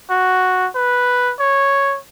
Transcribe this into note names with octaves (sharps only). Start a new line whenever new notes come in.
F#4
B4
C#5